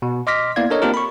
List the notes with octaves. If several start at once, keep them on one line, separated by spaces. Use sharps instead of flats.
B2
D#5 C6 D6 F6 A#6 B6
A#3 B3 E4 D5 F5 G#6
D4 A4 A#4 C#5 D#5
A#3 C4 D4 F4 G4 A#4
B5 C#6